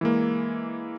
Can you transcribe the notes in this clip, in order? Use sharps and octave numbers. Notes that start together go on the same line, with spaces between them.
E3 G#3 A#3